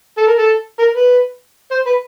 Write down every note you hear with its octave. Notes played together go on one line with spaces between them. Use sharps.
A4
A#4
A4
A#4
B4
C5
B4